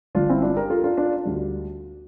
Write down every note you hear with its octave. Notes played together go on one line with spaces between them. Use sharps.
G1 G2 D3 D4 F4
C4 E4
D4 F4
G4 A#4
F4 A4
D4 F4
D4 F4
D2 D3 G3